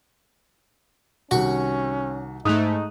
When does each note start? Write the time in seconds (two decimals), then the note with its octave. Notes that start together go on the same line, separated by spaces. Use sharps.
1.31 C2 D#3 C#4 F#4 C#6
2.45 G#2 A3 D#4 D#6 F#6 F7